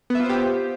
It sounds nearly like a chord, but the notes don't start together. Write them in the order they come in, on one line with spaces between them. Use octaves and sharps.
B3 E5 F4 C5 G4